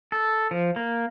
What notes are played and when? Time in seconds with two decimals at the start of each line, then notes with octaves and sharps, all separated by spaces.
0.12 A4
0.51 F3
0.76 A#3